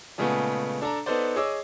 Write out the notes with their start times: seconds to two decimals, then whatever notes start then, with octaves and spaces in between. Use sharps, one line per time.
0.18 A#2 C#3 G#3 A3 B3
0.81 D4 A4 D5 A#5
1.06 B3 D#4 A4 B4 C5 D5
1.36 G#4 C#5 D#5 D6 E6